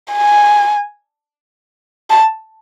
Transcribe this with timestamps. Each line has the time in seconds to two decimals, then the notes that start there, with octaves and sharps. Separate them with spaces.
0.13 G#5
2.10 A5